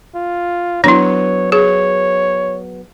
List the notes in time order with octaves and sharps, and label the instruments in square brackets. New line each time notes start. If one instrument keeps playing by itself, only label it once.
[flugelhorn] F4
[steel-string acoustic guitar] F#3 B3 [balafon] D4 E4 [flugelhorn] C#5
[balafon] G#4 [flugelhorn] C#5